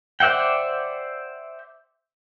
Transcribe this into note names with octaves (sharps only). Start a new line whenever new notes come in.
C5 D5 E5 F#5 G5